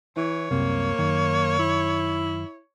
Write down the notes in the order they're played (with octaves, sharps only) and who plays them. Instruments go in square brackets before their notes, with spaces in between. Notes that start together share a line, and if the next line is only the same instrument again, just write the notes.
[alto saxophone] E3 [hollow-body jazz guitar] E4 [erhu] C#5
[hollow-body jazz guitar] C2 F#2 C3 [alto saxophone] A#3
[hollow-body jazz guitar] F#2 D#3
[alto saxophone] E4